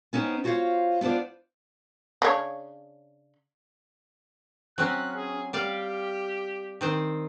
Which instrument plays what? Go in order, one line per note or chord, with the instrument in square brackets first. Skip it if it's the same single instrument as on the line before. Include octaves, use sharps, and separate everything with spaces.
[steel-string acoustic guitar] B3 C#4 D#4 C5 G5
F4 F#4 C5 C#5 F5
B3 D4 F4 C5 D5
[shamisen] C#3 D4 C#5
[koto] F#3 C4 C#4 [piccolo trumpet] F#6
[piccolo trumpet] G#4
[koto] G3 D5 F5 [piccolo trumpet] G4
[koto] D#3 C4 C5